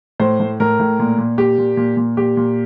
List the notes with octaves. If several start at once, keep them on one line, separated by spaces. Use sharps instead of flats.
A2 C5
A2
A2 A#4
A2
A#2
A#2
A#2 G4
A#2
A#2
A#2
A#2 G4
A#2